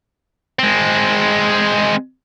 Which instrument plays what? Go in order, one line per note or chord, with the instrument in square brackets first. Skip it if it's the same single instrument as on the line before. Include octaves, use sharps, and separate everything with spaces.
[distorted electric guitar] G#3 C4